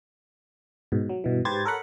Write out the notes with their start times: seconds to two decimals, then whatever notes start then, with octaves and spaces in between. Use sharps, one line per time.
0.92 G#2 B2
1.09 F#3
1.24 G2 B2 E3
1.45 G#2 G4 B4 C5 G#6 A6
1.65 A4 A#4 C#5 F#5 B5